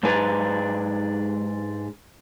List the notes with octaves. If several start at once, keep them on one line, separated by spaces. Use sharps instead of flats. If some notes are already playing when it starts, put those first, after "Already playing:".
G#2 G#3 D4 B4 D5 A#5